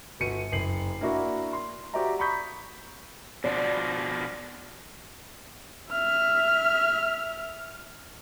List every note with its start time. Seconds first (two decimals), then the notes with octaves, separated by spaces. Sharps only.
0.20 G1 F#4 C#7 D#7
0.52 F#1 C7 F#7
1.01 A#3 D4 E4 F#4 A#4
1.53 C6
1.94 F#4 G4 C5 D5 E5 A#5
2.19 A#5 B5 C#6 D#6 G6 B6
3.44 B2 F3 D4 D5
5.91 E5 F6